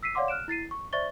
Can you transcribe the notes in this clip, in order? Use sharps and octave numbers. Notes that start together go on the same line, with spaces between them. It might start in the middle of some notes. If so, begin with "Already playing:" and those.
E6 B6 C7 D#7
C#5 D5 F5 F#5 C6 D6
F6 F#6 D7 E7
E4 A6 C7 D#7
C#6
C5 D5 E5 C#6 A6 G7